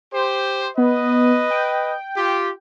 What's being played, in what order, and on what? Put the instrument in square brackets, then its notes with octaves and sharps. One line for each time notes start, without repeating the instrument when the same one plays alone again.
[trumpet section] G4 C5
[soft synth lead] B3 [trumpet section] B4 D#5
[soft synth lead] G5
[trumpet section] F4 G4